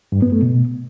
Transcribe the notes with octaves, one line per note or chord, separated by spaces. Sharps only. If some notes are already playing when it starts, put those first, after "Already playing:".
G2
B3
A3
B2